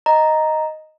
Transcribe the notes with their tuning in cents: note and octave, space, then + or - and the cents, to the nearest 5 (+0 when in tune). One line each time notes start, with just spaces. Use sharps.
D#5 +0 A#5 +0